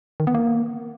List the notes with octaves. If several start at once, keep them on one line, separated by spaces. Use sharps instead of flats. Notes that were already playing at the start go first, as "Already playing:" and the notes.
D#3
B3
A#3